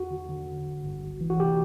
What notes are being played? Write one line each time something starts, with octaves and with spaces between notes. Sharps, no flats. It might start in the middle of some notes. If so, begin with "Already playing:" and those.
Already playing: E2 F#4
D3
D3
D3
G1
G1
C2
E3
F#4
C3 G4